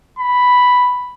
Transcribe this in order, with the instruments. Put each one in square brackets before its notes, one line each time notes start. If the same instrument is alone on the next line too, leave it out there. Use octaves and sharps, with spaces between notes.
[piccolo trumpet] B5